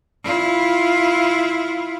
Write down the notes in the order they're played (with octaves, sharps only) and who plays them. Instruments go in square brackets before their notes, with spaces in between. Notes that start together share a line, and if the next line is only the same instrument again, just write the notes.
[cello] E4 F4